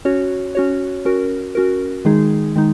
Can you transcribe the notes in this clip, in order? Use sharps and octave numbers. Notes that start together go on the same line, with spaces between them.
C#4 F#4 C#5
C#4 F#4 C#5
C#4 F#4 A#4
C#4 F#4 A#4
D#3 G#3 D#4 G#4
D#3 G#3 D#4